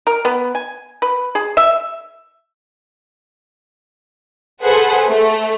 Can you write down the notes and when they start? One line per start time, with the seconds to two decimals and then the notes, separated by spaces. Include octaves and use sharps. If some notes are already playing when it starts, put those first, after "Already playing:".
0.07 A#4
0.25 B3
0.55 G#5
1.02 B4
1.35 G#4
1.57 E5
4.63 G#4 A4 B4 C5 F#5
5.08 A3